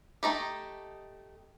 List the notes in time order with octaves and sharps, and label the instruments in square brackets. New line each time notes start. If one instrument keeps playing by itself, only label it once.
[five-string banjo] A3 D#4 G4